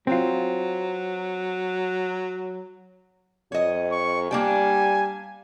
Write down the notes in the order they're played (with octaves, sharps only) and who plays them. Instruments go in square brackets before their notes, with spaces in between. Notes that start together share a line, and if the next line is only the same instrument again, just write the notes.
[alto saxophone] F#3 [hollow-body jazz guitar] C4 F4
[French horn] F2 [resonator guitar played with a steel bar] C#5 D#5
[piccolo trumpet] C#6
[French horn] G3 [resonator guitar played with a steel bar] A#3 D4 G5 [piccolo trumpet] G#5